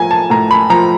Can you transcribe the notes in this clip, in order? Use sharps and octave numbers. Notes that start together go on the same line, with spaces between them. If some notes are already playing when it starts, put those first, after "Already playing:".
Already playing: A2 F3 G#5 A#5
A5
A2 A#5
B5
F3 A#5